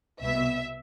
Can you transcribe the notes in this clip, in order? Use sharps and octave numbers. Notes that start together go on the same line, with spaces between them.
C2 B2 B3 E5